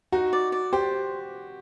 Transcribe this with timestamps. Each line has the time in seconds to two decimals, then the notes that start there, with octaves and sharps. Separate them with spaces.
0.12 D#4 F#4
0.33 D5
0.52 D5
0.73 G4 C5